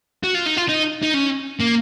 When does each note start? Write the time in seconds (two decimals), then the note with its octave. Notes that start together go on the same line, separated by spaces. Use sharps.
0.24 F#4
0.35 F4
0.46 D#4
0.57 F4
0.69 D#4
1.03 D#4
1.14 C#4
1.60 A#3